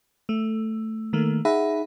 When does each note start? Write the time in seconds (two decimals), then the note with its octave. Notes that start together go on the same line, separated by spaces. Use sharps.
0.29 A3
1.13 D#3 A3 A#3
1.45 D#4 G#4 E5 F#5 B5